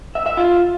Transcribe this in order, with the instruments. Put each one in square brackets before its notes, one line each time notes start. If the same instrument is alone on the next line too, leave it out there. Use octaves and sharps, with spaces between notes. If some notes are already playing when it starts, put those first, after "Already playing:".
[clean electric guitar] E5
E5
F4